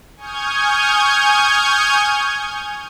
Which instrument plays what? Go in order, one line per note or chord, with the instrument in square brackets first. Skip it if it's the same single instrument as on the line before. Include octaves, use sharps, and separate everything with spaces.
[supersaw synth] G#5 C#6 D#6 F6 G6 G#6